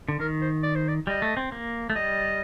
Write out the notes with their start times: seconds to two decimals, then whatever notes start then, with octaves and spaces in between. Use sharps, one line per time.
0.09 D3
0.20 D#3 A#4
0.42 C5
0.63 D5
0.75 C5
0.88 D5
1.07 G3 D#5
1.22 A3
1.37 C4
1.52 A#3
1.90 A3
1.96 G3 D#5